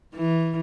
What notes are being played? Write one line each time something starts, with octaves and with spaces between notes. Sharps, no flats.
E3